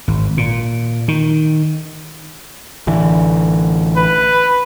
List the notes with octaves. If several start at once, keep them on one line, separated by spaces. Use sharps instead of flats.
G#1
A#2
D#3
A1 D3 E3
B4